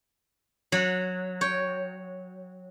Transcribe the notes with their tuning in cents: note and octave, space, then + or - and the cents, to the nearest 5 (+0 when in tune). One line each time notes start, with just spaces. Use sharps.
F#3 -15 F#5 -25
C#5 +0 G5 +0